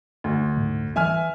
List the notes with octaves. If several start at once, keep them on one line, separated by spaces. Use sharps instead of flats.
D2
G#2
E3 E5 G#5 F6